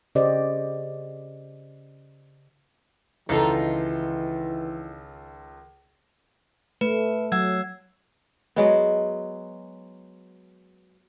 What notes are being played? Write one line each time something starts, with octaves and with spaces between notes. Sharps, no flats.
C#3 G4 C5 D5 D#5
C#2 D#3 E3 D#4 F4 A4
A3 B4
F#3 F#5 E6 G#6
F#3 G#3 B3